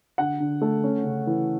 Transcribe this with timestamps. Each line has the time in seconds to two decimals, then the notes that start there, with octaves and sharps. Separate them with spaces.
0.18 D3 F#5
0.40 D3
0.62 A3
0.84 C#4
1.04 C#3
1.27 E3